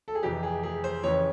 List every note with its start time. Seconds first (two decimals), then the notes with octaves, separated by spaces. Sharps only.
0.08 A4
0.15 G#4
0.23 F2 C3 E3 G4
0.43 G#4
0.63 G#4
0.84 C5
1.03 F2 C#3 E3 C#5